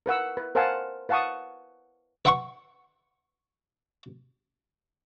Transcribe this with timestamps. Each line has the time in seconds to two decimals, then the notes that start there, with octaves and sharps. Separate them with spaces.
0.06 A#4 B4 F#5 E6
0.37 B4
0.55 A#4 C5 F5 F#5 G#5 A5
1.09 B4 F5 F#5 A5 C#6 D#6
2.25 B4 E5 F#5 C6 C#6